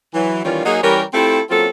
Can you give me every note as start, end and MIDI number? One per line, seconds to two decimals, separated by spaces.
0.14 0.43 52
0.14 0.43 54
0.44 0.65 51
0.44 0.65 52
0.44 0.65 55
0.44 0.65 61
0.44 0.65 65
0.66 0.81 54
0.66 0.81 58
0.66 0.81 63
0.66 0.81 66
0.66 0.81 68
0.83 1.03 52
0.83 1.03 55
0.83 1.03 61
0.83 1.03 67
0.83 1.03 70
1.13 1.40 57
1.13 1.40 60
1.13 1.40 64
1.13 1.40 65
1.13 1.40 67
1.13 1.40 69
1.50 1.67 54
1.50 1.67 58
1.50 1.67 60
1.50 1.67 61
1.50 1.67 65
1.50 1.67 69